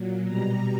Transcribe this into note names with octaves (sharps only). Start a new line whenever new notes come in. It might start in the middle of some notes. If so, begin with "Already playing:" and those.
Already playing: A#2 F#3
B2 G3 A#5